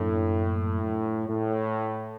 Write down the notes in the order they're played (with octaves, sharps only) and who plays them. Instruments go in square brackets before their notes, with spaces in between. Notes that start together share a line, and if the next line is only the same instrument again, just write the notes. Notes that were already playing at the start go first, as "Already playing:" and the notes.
Already playing: [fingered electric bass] F#2 F#3 A#3 D4 [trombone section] A2
[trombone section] A2